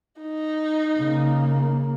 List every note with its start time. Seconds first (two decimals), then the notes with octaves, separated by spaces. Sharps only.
0.22 D#4
0.98 C#3 A#3